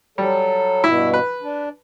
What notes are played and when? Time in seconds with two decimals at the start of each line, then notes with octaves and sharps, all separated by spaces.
0.18 F#3 G3 A4
0.84 G2 B2 E4
1.14 B4
1.42 D4